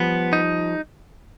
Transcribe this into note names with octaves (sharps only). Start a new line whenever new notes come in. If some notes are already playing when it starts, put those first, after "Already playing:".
Already playing: F3 G3 B3
D#4